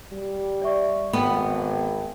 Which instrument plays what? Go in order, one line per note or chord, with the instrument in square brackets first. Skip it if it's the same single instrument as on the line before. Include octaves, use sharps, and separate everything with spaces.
[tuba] G3
[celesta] D5 E5 C#6
[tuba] G#1 [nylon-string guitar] B3 [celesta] G5